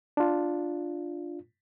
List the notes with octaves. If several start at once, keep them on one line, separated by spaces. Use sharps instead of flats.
D4 F4